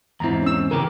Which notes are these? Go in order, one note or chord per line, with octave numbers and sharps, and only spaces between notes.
E2 G#2 C4 E4 A#5
C#4 E6
C#3 E3 G4 A#4